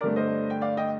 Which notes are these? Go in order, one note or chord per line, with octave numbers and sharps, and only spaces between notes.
G2 D3 A3 A#4 D5
C5 D#5
G5
D5 F5
D#5 G5